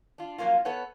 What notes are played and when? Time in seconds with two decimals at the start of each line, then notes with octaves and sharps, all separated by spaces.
0.18 D4 F4
0.38 F3 F#3 A#3 C#4 F4
0.65 B3 A4 B4 C#5 F#5